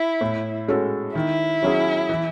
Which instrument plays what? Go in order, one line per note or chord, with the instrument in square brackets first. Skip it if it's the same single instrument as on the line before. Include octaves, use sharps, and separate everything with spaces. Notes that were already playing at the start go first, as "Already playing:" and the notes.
Already playing: [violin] E4
[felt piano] A2
G#3 C#4 F#4 A4
[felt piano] D#3 [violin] E4
[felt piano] F#3 C#4 G#4
E3